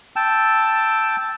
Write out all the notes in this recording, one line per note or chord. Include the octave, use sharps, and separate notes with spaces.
G5 A5 E6